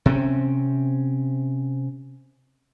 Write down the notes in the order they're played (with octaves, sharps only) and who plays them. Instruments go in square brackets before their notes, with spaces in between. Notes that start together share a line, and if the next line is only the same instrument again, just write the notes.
[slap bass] C3 C4 C#4